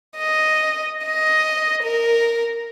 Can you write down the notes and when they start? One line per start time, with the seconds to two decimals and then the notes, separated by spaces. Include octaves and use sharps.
0.17 D#5
1.05 D#5
1.83 A#4